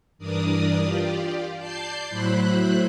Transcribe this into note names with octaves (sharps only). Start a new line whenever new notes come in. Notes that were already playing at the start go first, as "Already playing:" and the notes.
G2 E3 D4 A#4 D5 D#6
F4 G4 D5
D5 A5 G6 C7
A2 F#3 E4 C5 B5 F#6